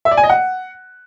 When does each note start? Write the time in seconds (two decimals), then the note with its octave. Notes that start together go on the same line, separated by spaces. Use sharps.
0.05 E5
0.11 D5
0.17 G#5
0.23 D#5
0.29 F#5